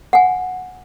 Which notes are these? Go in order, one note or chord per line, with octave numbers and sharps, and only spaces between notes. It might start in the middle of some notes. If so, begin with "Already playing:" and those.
F#5 G#5